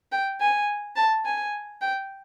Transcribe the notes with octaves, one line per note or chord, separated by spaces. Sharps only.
G5
G#5
A5
G#5
G5